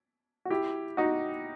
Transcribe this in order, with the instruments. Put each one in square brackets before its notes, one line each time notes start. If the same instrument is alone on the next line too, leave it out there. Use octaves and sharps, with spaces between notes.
[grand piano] F#4
E4 G4
D#4 F#4